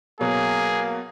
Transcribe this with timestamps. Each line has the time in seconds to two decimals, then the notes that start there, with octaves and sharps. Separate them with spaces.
0.21 B2 F#3 A#3 G#4